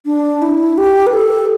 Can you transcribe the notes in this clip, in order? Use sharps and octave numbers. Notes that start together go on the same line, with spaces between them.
D4
E4
G4
B4
A4